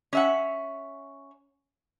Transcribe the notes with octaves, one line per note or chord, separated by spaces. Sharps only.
C#4 E5 F#5